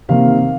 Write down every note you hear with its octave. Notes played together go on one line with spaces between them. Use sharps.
C3 D#3 A#3 F5